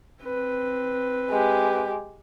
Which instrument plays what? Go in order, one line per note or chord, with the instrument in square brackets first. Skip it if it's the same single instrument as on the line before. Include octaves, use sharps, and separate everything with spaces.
[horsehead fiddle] C4 B4
[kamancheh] G#3 G4